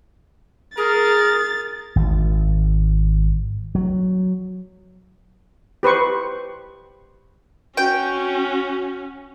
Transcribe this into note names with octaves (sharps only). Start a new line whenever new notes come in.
G#4 A#4 A6
G#1
F#3
G4 B4 C5 C#6
C#4 F#4 G5